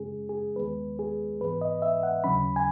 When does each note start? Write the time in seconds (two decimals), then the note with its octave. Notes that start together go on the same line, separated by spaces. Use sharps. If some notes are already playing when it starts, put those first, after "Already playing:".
Already playing: F#2 C#3 G#3 C#4 G#4
0.29 G#4
0.56 D#2 D#3 G#3 B3 B4
0.99 G#4
1.40 G#2 E3 B3 B4
1.61 D#5
1.82 E5
2.03 F#5
2.24 D#2 C#3 F#3 C#4 B5
2.56 G#5